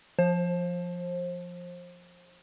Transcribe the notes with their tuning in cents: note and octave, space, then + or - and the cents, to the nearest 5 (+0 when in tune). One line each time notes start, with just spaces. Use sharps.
F3 +0 C5 +30